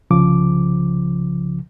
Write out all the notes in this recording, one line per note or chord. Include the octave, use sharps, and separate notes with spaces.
C2 C#3 F3 D6